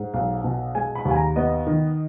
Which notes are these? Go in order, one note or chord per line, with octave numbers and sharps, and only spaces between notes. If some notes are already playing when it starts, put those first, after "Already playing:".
Already playing: G#2
B1 F5
B2
G#3 G#5
B5
D#2
G#5
A#5
B3 D#5
D#3